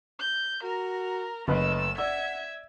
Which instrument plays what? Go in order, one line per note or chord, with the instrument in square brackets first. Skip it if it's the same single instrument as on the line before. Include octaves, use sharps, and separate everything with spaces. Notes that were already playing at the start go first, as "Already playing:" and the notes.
[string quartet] G6
[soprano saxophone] F#4 [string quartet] A#4 A#5
[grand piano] F#1 B4 [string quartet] A3 E6 [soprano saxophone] D#5
[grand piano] D5 E6 [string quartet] E5 G#6 [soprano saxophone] F#5